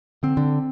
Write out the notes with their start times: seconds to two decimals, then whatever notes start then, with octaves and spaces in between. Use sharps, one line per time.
0.23 D3 C4
0.37 D3